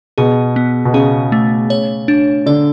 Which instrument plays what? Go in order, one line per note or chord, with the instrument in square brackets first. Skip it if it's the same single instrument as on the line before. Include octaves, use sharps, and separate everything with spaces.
[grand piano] B2 [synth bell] G#4
[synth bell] B3
[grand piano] B2
[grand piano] C#3 [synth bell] G#4
[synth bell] A3
C#5
D4
[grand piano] D3 [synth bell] D5